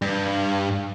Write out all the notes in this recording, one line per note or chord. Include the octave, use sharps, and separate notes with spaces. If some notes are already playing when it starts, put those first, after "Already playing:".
G2